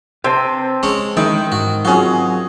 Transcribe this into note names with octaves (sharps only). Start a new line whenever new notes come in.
C3 C4 B4 C5 A5
G#3 C#4 C#5
D#3 E3 G#3 E4 A#4 D#5
G#2 F#4
F#3 C4 C#4 F4 F#4 G#4